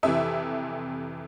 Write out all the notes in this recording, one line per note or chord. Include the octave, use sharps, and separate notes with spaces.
F2 C3 E3 E5